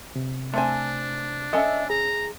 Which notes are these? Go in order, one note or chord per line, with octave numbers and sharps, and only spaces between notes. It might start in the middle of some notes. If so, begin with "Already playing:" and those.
C3
A3 C4 D4 G#5
C#4 A4 D#5 E5
G#4 A#5